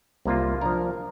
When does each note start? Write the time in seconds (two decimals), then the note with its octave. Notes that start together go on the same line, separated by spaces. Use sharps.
0.25 C2 C3 A#3 F4
0.61 F3 D4 A#4